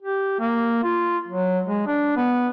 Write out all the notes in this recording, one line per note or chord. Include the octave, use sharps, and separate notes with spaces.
G4
A#3
F4
F#3
G#3
D4
B3